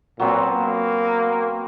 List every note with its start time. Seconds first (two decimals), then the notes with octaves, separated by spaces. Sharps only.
0.20 A#2 F#3 B3 C4
0.53 A#3